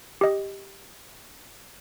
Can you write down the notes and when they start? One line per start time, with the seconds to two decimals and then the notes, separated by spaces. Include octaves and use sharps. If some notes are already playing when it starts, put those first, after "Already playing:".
0.21 G4 D#5